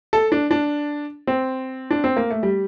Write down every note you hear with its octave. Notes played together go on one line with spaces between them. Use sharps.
A4
D4
D4
C4
D4
C4
A#3
A3
G3